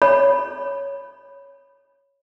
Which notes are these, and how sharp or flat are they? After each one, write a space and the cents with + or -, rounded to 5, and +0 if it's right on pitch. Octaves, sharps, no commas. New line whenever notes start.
C#5 +0 B5 +0